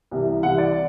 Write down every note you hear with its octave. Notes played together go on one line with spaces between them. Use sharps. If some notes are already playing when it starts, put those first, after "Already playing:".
C2 C3 E3
C2 C3 E3 F#5
D5